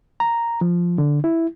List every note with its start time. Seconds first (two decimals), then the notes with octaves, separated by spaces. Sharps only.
0.20 A#5
0.61 F3
0.98 D3
1.24 E4